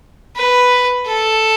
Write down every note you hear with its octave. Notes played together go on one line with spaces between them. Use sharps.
B4
A4